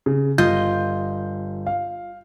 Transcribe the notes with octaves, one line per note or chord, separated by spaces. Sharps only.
C#3
G1 F4 D#5 G6
F5